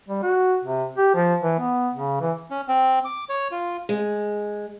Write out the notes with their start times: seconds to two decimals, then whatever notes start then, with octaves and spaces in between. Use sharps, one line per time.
0.08 G3
0.23 F#4
0.64 C3
0.97 G4
1.15 F3
1.42 E3
1.59 B3
1.94 C#3
2.21 E3
2.50 C#4
2.68 C4
3.05 D6
3.29 C#5
3.51 F4
3.89 G#3